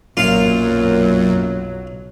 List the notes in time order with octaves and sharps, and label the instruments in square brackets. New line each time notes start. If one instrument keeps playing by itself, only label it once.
[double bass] B1 F#3 [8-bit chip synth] F#2 [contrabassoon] A#2 [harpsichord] F4 F5